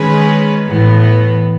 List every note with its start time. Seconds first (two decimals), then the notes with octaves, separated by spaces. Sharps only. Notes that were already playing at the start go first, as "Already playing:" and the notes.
Already playing: D#3 G#3 C#4 G#4 B4
0.68 A2 E3 B3